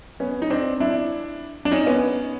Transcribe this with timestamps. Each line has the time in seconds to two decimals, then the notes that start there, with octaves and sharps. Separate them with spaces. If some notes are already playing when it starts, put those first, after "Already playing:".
0.20 B3 C#4
0.42 D#4
0.50 C4 D4
0.80 D4 E4
1.65 D4
1.72 C#4 D#4
1.86 B3 C#4